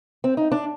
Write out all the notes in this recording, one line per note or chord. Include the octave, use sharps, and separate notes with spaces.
C4
D#4
D4